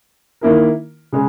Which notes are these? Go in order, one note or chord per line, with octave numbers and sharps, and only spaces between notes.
D#3 A#3 E4 A#4
C#3 G#3